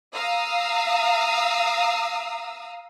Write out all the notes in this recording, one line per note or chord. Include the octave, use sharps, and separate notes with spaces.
F5 A#5 D#6 E6